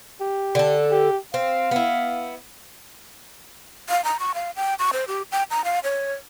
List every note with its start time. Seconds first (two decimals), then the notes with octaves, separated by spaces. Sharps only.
0.20 G4
0.55 D3 A4
0.91 G4
1.34 C4 F5
1.71 B3 E4
3.89 F5
4.04 A#5
4.20 C#6
4.35 F5
4.56 G5
4.79 C#6
4.93 C5
5.08 G4
5.32 G5
5.51 A#5
5.65 F5
5.84 C#5